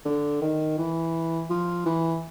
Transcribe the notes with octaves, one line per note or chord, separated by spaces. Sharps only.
D3
D#3
E3
F3
E3